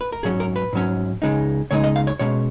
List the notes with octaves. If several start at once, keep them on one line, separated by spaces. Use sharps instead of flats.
B4
A#4
G#2 F#3 C#4 G#4
A#4
B4
G#2 F#3 C#4
C#2 C#3 G#3 D#4
C#2 C#3 G#3 D#4 C#5
D#5
F5
C#5
B2 G#3 C#4 C#5